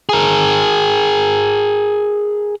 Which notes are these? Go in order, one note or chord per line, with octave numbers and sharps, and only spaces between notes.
G#4 A#4